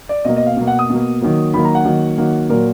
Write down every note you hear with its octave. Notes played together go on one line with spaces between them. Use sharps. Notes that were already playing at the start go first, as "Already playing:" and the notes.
D5
B2 A#3 D#5
D#5
F5
B2 A#3
F#5
D#6
B2 A#3
D#3 F#3 A#3
D#3 F#3 A#3 B5
A#5
F#5
D#3 F#3 A#3
D#3 F#3 A#3
A#2 F#3 A#3 A#4